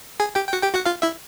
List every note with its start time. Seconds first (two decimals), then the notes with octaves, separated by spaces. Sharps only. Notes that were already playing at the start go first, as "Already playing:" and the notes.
0.20 G#4 G#5
0.35 G4 G5
0.47 G5
0.53 F#4 F#5
0.63 G4 G5
0.74 F#4 F#5
0.85 F4 F5
1.02 E4 E5